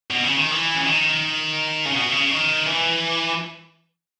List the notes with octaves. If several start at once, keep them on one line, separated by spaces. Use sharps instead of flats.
B2
C#3
D#3
E3
C#3
D#3
C#3
B2
C#3
D#3
E3